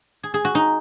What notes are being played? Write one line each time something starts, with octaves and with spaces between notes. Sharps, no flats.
G#4
G#4
F#4
D#4